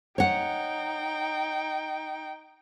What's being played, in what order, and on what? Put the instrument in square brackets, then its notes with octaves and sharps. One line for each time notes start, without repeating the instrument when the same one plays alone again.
[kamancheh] D#4 G5 [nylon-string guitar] C#5 F#5